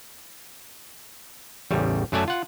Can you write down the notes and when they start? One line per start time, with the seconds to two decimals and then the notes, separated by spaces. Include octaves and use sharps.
1.71 A1 E2 C#3 G3
2.12 F#2 F#3 A3 D5 G#5 A5
2.28 F4 F#5